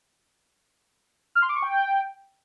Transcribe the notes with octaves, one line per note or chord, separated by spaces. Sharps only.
F6
C6
D6
C#6
G5